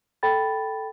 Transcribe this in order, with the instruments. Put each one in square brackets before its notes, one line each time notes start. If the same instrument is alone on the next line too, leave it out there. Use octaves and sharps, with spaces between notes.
[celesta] A4 G5 B5 A6